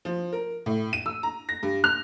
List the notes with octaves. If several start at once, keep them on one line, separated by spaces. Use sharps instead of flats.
F3
A#4
A2
D#7
E6
A#5
A#6
G2
F6